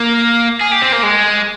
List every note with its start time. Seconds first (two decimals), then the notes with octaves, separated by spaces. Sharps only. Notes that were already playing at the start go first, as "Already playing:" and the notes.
Already playing: A#3
0.61 G#4
0.71 G4
0.82 C4
0.92 A#3
1.03 G#3